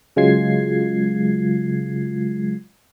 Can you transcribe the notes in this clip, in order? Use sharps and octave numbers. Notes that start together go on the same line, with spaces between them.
C#3 F#3 G#3 F4 G#6 C7